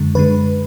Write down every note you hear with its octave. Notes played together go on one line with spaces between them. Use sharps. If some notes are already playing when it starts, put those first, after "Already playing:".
Already playing: F#2 D3 G#3
F#2 D3 G#3 B4